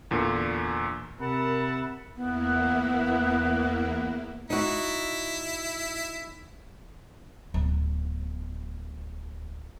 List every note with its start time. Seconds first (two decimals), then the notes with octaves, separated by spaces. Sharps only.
0.11 E2 A#2 D3
1.20 C3 A#4 E5 F#5 A5 B5
2.16 E2 A#3 B3 E4
4.50 D#4 E4 F#4
7.54 D1 B3